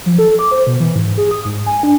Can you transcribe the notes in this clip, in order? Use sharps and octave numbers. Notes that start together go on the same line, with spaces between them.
F3
A4
D6
C5
B2
E3
G#2
G#4
D#6
G#2
G#5
D4